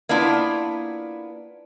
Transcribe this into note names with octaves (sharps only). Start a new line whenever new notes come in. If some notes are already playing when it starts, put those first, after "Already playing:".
A#3 B3 D4 E4 F4